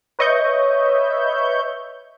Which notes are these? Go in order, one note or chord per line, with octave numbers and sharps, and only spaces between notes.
B4 C#5 D#5 E5 C#6 G6